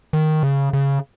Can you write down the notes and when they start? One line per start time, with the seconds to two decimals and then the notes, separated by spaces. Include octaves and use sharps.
0.13 D#3
0.43 C#3
0.73 C#3